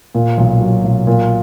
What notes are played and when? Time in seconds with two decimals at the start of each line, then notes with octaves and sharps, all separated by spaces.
0.15 A#2
0.38 B1
0.61 F#3
0.84 B1
1.07 A#2